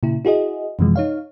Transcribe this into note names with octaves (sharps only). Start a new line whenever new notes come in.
A#2 C#3 E4
E4 F#4 G#4 D#5
F#2 C3 E3 F3 G#3
D#4 C#5 F5